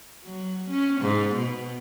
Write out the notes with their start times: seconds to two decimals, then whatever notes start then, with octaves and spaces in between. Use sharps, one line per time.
0.25 F#3
0.70 C#4
1.01 G#2
1.35 B2